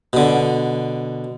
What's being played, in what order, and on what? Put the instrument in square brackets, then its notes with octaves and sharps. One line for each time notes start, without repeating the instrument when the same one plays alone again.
[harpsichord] B2 D3